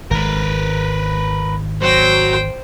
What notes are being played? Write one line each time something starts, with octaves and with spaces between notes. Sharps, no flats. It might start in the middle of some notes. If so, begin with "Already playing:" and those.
G#1 G#2 A#4 B4
F#3 C5 G5